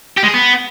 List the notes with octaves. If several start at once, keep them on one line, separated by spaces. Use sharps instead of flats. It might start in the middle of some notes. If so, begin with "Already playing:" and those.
G4
G#3
G#4
B3